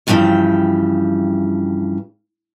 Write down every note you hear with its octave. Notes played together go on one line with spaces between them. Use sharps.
E2 G2 C#3 E3 F3 G5